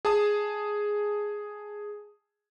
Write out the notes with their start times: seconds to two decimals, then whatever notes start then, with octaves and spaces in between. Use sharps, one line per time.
0.05 G#4 A5 D#6